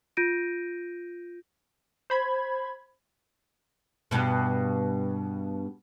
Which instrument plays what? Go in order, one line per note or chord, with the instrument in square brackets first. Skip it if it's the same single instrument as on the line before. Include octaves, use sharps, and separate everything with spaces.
[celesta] F4 G6 A#6 D7 D#7
[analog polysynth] C5 B5 G#6
[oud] G2 B2